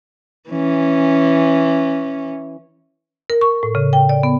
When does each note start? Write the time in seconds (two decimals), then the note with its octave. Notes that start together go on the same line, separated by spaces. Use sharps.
0.50 E3 C#4
3.30 A#4
3.41 C#6
3.63 A2
3.75 C#3
3.93 G5
4.09 D5
4.23 B3